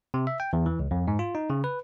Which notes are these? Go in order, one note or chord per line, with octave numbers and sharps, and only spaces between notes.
C3
E5
G5
E2
E3
C#2
F2
G#2
F4
D#4
C#3
B4